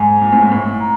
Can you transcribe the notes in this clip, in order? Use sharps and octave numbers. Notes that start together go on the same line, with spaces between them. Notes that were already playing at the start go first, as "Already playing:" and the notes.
Already playing: G#2 G#5
A#2
A2
G#2
A2
A#5